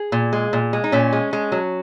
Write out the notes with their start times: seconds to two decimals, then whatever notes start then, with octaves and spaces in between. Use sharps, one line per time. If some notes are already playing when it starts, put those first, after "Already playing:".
Already playing: G#4
0.12 A#2
0.33 G#3
0.53 A#2
0.73 G#3
0.84 D#4
0.92 A#2 C#4
1.13 G#3
1.33 G#3
1.52 F#3